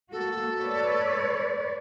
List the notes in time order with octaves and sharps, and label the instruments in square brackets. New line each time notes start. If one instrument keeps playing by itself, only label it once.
[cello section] A#3 F#4 [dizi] A4
[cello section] B4 C#5 D5